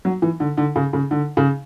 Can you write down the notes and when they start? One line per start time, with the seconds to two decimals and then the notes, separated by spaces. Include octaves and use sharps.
0.05 F#3
0.22 E3
0.40 D3
0.57 D3
0.76 C#3
0.93 C#3
1.11 D3
1.37 C#3